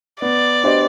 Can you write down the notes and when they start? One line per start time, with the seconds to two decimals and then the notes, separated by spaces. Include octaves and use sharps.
0.21 B3 D5
0.64 D4 G4 C5 D#5